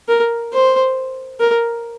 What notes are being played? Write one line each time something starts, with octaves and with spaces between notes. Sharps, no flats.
A#4
C5
A#4